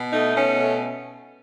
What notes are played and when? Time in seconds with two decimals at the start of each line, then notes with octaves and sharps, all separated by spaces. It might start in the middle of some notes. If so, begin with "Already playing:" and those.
Already playing: B2
0.12 A3 D#4
0.35 B2 C#4
0.60 A3